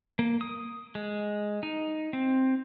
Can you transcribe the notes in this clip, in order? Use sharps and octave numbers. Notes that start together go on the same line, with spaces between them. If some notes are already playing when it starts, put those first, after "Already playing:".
A#3
D#6
G#3
D#4
C4